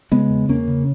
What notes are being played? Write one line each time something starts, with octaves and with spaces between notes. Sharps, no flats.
C#3 G#3 B3
E2
E2 A#3 C#4
C#3